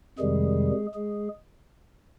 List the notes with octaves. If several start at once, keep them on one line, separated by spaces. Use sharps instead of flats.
F2 C3 D#3 G3 G#3 G#4
G#3 G#4